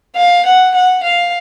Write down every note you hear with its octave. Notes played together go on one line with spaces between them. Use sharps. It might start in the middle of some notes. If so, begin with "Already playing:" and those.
F5
F#5
F#5
F5